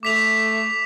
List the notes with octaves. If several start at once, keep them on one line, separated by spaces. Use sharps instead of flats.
A3 D6 B6 F7